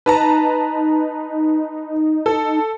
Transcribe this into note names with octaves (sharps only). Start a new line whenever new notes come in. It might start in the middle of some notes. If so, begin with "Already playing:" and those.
D#4 B4 A5 A#5
A4